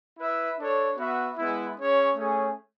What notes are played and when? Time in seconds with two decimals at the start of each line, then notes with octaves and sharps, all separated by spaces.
0.19 E4 B4 E5
0.58 D4 A4 C#5
0.98 B3 F#4 B4 E5
1.37 G#3 B3 E4
1.77 C#4 G#4 C#5
2.16 A3 C#4 G#4 C#5